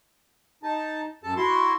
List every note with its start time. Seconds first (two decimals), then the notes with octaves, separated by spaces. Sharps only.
0.63 D#4 A5
1.23 F#2 A4 A5
1.37 E4 F#4 C6